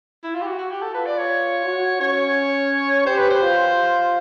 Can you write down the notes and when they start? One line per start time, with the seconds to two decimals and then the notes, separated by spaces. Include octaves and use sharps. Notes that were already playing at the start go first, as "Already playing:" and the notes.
0.23 E4
0.35 F4
0.42 G4
0.47 F#4
0.59 F#4
0.71 G4
0.82 A4
0.94 F4 B4
1.06 D5
1.18 C#5
1.65 F#4
2.00 C#4 C#5
3.06 G4 C5
3.18 B4
3.30 C5
3.42 F4